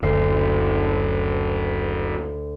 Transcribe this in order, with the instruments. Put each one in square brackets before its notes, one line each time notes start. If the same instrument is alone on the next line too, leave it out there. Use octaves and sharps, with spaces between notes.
[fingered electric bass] F#1 [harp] D2 F6 C7